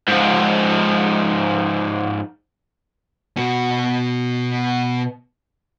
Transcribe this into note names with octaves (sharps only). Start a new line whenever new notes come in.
G#2 F3
B2 F#4